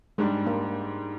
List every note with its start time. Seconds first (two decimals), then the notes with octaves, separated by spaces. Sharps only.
0.18 G#2 G3 G#3 D4
0.47 A#3